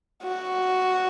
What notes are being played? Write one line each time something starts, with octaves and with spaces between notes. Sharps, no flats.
F#4